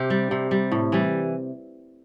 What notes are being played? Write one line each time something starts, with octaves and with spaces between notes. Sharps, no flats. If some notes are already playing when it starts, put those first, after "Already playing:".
Already playing: C3 G4
G3
C3
G3
A2
E3 G3